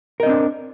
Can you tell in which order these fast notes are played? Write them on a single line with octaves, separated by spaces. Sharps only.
A#4 D#5 C4 D4